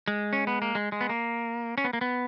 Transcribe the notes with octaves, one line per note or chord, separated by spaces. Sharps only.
G#3
C#4
B3
A#3
G#3
G#3
B3
A#3
C#4
B3
A#3
B3